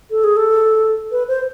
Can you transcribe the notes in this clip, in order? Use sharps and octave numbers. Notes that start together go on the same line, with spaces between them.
A4
G#4
A4
B4
C5